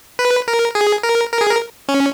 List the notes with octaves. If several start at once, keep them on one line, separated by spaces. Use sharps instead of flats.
B4
A#4
G#4
A#4
A#4
G#4
A#4
C#4